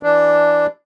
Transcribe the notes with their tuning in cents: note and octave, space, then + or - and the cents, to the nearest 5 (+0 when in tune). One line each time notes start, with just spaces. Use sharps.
E3 +10 D4 +0